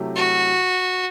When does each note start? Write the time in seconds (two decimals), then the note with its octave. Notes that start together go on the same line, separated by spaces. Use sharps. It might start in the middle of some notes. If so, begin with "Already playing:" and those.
Already playing: C3 F#3 A3 E4 G4
0.16 F#4